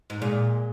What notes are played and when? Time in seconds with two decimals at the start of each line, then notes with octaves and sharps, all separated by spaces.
0.10 G#2
0.22 A#2 G#3